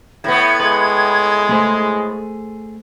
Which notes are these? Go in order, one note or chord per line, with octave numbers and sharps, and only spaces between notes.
A2 B3 G#6
G#3 B4
A3 G#4 C5